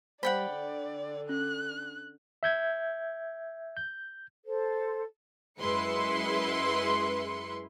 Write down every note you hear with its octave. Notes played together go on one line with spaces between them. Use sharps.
G3 C5 D5 F#5 G5 B5
D3
C#4 F#6
E5 G6 G#6
G6
A4 C5
F#2 G#3 E4 B4 C6 C#7